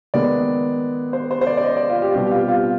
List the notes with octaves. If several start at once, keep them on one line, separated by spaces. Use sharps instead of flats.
D#3 G#3 B3 D5
C5
C5
C5
D5
D5
D#5
D5
F4
G4
B2 G3 C4 G4
G4
F4
F4